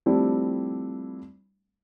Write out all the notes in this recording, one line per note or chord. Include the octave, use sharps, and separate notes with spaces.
F3 G3 A3 C4 D4 E4